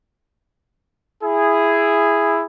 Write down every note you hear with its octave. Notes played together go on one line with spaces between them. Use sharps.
E4 G#4